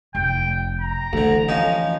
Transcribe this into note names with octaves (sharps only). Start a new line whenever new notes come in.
F1 G5
A#5
D2 D3 E3
F3 C#4 D#4